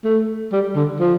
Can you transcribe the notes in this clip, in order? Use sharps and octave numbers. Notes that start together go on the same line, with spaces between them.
A3
G3
D3
F3